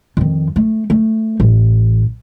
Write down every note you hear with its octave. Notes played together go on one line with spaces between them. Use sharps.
F2 D#3
A3
A3
A1 E3